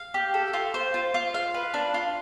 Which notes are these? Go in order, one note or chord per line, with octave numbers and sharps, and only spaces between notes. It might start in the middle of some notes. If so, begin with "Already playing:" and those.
Already playing: F5
G4
A4
F4
C5
F4
F4
F5
B4
D4
F4